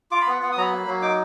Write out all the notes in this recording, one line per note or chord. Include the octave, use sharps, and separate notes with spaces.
F4 D6
B5
B3 F#5
B3 F#5
D#6
F#3 A#5
B5
A#3
F#3
D#4 D6